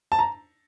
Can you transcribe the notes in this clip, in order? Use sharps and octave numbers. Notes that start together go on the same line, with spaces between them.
A5
A#5